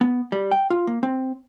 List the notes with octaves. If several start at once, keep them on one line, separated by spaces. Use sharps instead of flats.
B3
G3
G5
F4
A#3
C4